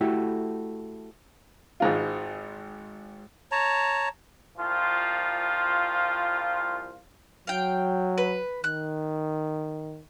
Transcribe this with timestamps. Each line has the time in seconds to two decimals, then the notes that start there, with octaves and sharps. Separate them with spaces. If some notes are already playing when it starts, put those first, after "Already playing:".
0.01 A3 E4 F#4 G4 A4
1.80 G#1 G#2 F4
3.52 C#5 A5 A#5
4.58 C2 F3 F4
7.47 F#3 F5 G5
8.18 B4
8.64 D#3 F#6